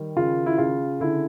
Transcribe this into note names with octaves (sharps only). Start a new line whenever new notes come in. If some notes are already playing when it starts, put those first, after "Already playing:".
Already playing: D#3 G3
C#3 F4
E4
C#3 F4
D3 E4